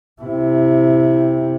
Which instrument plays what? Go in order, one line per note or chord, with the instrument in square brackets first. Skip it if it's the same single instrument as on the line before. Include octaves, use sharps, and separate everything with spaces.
[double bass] C3 E4